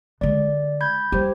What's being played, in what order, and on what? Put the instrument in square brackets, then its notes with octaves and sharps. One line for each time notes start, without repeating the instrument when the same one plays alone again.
[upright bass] D3 G#3 [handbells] D5
[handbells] B5 G6 G#6
[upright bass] G3 [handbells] G4 C5